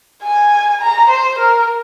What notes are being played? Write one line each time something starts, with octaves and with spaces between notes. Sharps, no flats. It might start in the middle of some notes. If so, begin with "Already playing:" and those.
G#5
A#5
C5
A#4